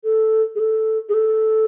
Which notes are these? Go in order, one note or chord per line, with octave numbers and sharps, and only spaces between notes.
A4
G#4
A4
G#4
A4